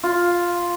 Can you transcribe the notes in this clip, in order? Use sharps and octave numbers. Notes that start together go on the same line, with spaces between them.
F4